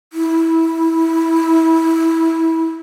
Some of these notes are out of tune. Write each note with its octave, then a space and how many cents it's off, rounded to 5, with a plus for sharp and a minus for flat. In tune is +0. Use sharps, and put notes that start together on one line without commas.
E4 -15